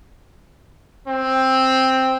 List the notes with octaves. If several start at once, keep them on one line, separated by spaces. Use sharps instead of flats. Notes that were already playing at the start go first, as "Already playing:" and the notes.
C4